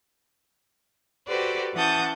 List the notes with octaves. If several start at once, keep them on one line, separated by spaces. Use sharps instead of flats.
F#4 G4 A4 B4 C5 D5
E3 C#4 F#5 A5 D#6 G6